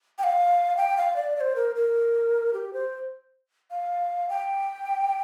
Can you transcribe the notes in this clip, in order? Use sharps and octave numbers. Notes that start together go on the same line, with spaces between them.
G5
F5
G5
F5
D5
D5
C5
A#4
A#4
G4
C5
F5
G5